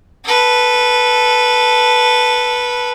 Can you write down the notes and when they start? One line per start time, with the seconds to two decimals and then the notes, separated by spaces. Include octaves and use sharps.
0.24 A4 B4